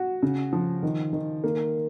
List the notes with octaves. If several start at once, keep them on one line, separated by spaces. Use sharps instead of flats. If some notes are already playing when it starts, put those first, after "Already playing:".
Already playing: F#4
C#3
F3
D#3
D#3
A#3